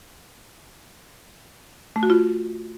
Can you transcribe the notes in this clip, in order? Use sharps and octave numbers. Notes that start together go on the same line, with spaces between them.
A3
F#4
F4